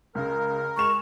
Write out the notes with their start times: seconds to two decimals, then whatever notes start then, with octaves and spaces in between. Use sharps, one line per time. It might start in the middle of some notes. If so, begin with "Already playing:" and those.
0.15 C#2 C#3 A#4
0.77 G#3 C#6 E7 F7